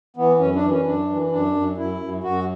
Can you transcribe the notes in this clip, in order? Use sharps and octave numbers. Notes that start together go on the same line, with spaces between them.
E3 B3
F#2 C#4
D4
E3
C#4
F#2 D4
E3
F#2 D4
F#2
F#2 E4
F#2
F#2 F#4